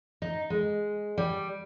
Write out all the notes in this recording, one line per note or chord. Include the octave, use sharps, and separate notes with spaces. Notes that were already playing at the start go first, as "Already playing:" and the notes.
D#4
G#3
G3